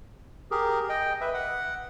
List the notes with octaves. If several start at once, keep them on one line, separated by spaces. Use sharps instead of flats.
G4 G#4 A#4
D#5 G5
B4 E5
F#5